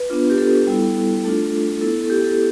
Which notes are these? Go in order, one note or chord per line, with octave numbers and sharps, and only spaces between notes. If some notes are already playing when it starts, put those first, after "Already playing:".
Already playing: B4
B3 D4 F4
G4
A4
G3 B3 E4 A4
A3 D4 F4 A4
B3 E4 A4
A4
G4
A4